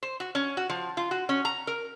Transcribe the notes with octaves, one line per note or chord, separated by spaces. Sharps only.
C5
F#4
C#4
F#4
F3
F4
F#4
C#4
A#5
A#4